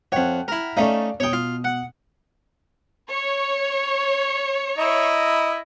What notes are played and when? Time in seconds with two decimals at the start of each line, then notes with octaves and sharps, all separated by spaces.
0.12 F2 C#5 F#5 G5
0.48 E4 A#4
0.77 A3 C#4 D#4 D5 F5
1.20 B2 C#5 G5 D#6
1.33 F4
1.64 F#5
3.10 C#5
4.78 E4 D#5 A#5